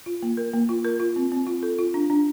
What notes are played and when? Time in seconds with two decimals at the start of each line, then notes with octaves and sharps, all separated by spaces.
0.06 F4
0.23 A#3
0.37 A#4
0.53 A#3
0.69 F4
0.85 A#4
1.00 F4
1.16 C4
1.32 C4
1.47 F4
1.63 A4
1.78 F4
1.94 D4
2.10 D4